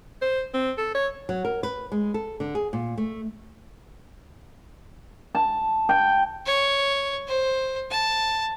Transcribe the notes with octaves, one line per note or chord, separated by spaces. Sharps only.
C5
C4
A4
C#5
F#3
A#4
B4
G#3
A4
D3
G#4
A#2
A3
A5
G5
C#5
C5
A5